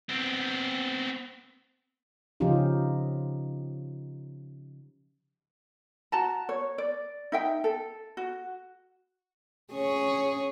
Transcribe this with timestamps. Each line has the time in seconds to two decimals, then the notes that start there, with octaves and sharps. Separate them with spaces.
0.09 B3 C4
2.40 C#3 F3 C#4 D#4 F4 G4
6.12 F#4 A5 A#5
6.49 C#5
6.78 D5
7.32 D#4 E5 G5
7.64 A4
8.17 F#4
9.72 C#4 G#4 C#5